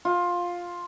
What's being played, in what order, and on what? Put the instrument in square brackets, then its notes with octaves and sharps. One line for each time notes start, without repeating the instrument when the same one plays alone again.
[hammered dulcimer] F4